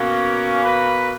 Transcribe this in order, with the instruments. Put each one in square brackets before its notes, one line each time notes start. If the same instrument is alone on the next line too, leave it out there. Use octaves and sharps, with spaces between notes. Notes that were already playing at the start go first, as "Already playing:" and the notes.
Already playing: [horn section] B2 A#3 C#4
B4